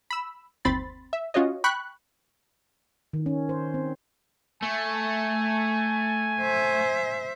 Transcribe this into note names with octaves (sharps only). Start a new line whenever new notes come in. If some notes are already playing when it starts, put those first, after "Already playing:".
B5 E6
G1 D#2 C4 B5 C6 A6
E5
C#4 F4 F#4 C#5 D#5
G5 B5 C#6 F#6
D#3
C#4
C5
C4
A3 G#5
C5 E5